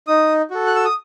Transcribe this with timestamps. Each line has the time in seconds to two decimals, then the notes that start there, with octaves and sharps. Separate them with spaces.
0.07 D#4 D#6
0.51 F#4 A4
0.67 F#6
0.75 E6
0.85 D#6